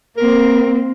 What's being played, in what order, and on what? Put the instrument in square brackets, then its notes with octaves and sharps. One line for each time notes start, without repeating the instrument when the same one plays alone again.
[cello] A#3 C4 [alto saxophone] A#4